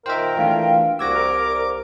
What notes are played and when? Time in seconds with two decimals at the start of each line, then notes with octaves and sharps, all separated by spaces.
0.06 A#2 D#3 A#4 C5 E5 G5
0.37 E3 A3 D4 F4 E5 F5
0.99 C2 F#4 D6 E6 G#6 A#6
1.14 A#4